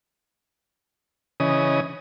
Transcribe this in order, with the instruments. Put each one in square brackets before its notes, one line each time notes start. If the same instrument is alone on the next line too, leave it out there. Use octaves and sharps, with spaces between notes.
[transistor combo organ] C#3 E3 C#4 D#5 D#6